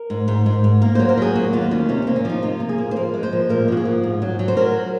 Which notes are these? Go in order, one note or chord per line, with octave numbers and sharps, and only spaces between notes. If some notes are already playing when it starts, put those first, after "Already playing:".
Already playing: A#4
G#2
G#2
G#2
G#2
A#3 A#4
F#3 C5
A#4
F#3 G#4
A#3 F#4
D#2 F4
D#3 C#4
C3 C#4
C4
A#3
C#4
F3 D#4
C3 F4
A#3
G#4
A#3
C5
F3 A#4
G#3
C5
F3
A#2 A#4
F3 F#4
G#4
F3
G#2
F#3
F#3
C5
F#3 A#4